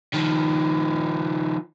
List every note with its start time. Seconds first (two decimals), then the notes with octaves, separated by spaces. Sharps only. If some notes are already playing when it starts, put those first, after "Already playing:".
0.14 D#3 F3